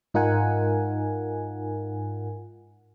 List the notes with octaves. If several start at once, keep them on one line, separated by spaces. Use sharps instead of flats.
G#2 D#4 F4 A#4 F#5 G#5